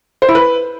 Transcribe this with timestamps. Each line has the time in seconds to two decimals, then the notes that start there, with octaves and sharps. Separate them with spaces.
0.22 C5
0.28 E4
0.35 B4